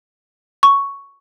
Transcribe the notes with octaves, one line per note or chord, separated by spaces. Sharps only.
C#6